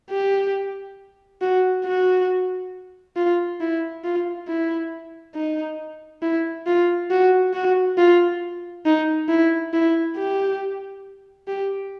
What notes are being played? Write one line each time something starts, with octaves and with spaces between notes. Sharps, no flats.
G4
F#4
F#4
F4
E4
F4
E4
D#4
E4
F4
F#4
F#4
F4
D#4
E4
E4
G4
G4